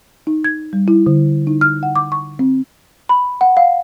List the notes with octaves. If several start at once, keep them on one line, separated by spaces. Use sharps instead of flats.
D#4
G#6
G3
E4
D3
D#4
F6
F#5
D6
C#6
C4
B5
F#5
F5